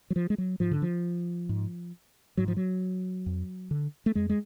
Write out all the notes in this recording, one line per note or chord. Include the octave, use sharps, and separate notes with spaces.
F#3
F3
G#3
F#3
G#2 F3
D3
F3
G#2
G#2 F#3
F3
F#3
F2
D3
A3
F2 G#3
G#3